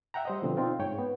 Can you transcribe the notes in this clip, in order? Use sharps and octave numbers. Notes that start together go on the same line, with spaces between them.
E5 F#5 G5 A#5
G3 C5 D#5
B2 D3 F3 C4
C4 D#4 F4
G#2 C#5 G5
B3